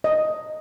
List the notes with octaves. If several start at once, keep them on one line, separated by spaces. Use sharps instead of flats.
D#5